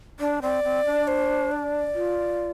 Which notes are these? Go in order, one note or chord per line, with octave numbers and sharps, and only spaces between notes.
D4 D5
C4 D5
C4
D4
C5
D5
F4